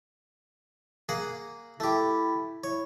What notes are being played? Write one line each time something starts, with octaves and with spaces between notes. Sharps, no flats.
A#3 G#4 F#5
A3 E4 G4
E4 C#5